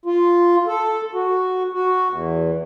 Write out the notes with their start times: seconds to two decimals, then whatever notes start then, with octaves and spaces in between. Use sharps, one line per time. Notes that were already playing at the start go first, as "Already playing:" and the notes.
0.06 F4
0.67 A4
1.14 F#4
1.73 F#4
2.11 E2